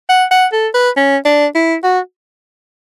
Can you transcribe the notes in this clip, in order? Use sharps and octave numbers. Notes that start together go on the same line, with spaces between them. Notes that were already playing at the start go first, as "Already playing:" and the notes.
F#5
F#5
A4
B4
C#4
D4
E4
F#4